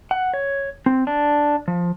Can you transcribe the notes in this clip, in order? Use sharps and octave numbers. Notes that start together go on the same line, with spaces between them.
F#5
C#5
C4
D4
F3